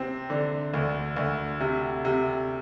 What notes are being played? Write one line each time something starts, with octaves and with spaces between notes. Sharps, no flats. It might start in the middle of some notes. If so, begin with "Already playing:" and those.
Already playing: C3 C4
D3
D2
D2
C3
C3